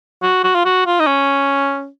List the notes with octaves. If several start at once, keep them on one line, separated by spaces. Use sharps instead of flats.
F#4
F#4
F4
F#4
F4
D#4
C#4